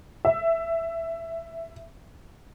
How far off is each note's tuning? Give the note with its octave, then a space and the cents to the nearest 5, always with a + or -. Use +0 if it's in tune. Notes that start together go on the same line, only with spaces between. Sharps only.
E5 +10